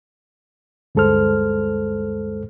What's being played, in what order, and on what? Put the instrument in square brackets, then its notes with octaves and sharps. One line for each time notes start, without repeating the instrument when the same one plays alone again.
[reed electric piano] D2 G2 G#3 A4 C5 F6